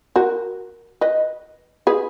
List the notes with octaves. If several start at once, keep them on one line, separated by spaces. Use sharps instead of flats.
F#4 A#4
B4 D#5
G#4 B4